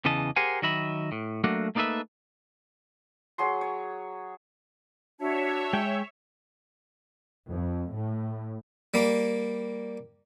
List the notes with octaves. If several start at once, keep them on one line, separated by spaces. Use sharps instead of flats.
E2 C#3 E3 D#5 A5
G4 G#4 A#4 C5 F#5 G#5
D#3 F#3 D#5 E5 B5
A2
F#3 A3 A#3 D4 F#4
A3 A#3 D#4 A4 B4 E5
F#3 G#4 C6
C#5
D4 F#4 C#5 E5 A5
G#3 G5
F2
A2
G3 A#3